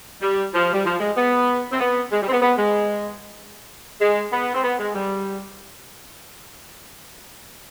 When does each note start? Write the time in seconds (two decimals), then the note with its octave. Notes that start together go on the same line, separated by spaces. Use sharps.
0.21 G3
0.53 F3
0.73 G3
0.85 F3
1.00 G#3
1.16 B3
1.72 C4
1.79 B3
2.11 G#3
2.22 G3
2.27 C4
2.31 B3
2.42 B3
2.58 G#3
4.00 G#3
4.32 B3
4.54 C4
4.64 B3
4.79 G#3
4.94 G3